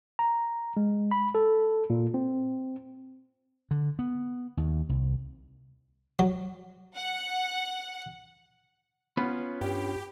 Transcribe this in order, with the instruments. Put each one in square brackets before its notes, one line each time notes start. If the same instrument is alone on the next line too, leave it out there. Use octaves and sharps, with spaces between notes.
[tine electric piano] A#5
G#3
B5
A4
A#2
C4
[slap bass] D3
B3
D#2
C2
[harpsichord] F#3
[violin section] F#5
[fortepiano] B3 [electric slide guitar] C#4 F4 B4
[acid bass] G2 [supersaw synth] G4